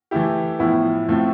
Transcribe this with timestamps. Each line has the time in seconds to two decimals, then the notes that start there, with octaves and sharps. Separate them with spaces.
0.11 E3 A3 E4 G4
0.59 A2 F3 B3 E4
1.08 A2 F3 A3 C4 F4